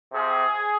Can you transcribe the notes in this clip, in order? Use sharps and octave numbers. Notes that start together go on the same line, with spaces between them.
C3 F3 C4 G#4